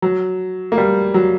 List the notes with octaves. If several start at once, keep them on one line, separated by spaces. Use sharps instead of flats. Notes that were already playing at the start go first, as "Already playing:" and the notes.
F#3
A#3
G3
F#3